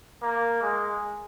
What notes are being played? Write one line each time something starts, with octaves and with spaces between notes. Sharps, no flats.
A#3
G#3